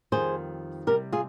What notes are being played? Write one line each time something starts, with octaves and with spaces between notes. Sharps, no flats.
F2 D#3 G3 G#4 C5
C3 G3 G4 A#4
F4 G#4